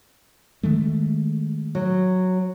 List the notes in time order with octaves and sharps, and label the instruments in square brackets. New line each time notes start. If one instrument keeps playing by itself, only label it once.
[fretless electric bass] D#3 G#3 A3
[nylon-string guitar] F#3